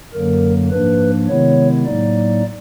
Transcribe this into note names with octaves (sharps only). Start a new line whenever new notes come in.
F#2 D3 F#3 A#3 A#4
G#2 F3 A#3 D4 B4
C3 D#3 G#3 B3 E4 C#5
A2 F#3 A#3 D#4 D5